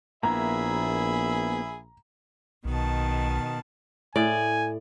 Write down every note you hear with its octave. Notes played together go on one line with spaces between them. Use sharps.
A#1 A#3 B3 E4 G#4 E5 A#5 B5
B1 B2 D#3 A5
A2 D5 G#5